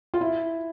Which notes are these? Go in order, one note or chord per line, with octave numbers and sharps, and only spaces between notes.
F4
E4